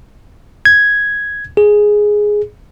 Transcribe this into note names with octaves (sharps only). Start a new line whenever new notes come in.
G#6
G#4